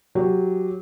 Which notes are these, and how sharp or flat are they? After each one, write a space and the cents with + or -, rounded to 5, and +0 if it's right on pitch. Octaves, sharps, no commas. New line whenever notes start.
F#3 -5 G4 +0